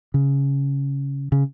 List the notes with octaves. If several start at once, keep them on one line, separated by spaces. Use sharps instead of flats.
C#3
C#3